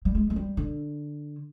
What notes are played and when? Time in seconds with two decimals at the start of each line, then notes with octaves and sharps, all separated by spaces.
0.05 G3
0.15 G#3
0.30 G#3
0.36 G3
0.57 D3